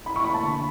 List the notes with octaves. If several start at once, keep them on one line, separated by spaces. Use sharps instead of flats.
E4 B5
C#6
E4 B5
A5
D3